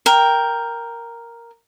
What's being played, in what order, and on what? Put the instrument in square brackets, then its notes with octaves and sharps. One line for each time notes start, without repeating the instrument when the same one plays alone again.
[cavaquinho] A#4 G5